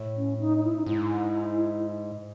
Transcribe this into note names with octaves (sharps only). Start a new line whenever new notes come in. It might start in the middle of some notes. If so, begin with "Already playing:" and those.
Already playing: A2
C#4
D#4
D#4
E4
D#4
G#2 E4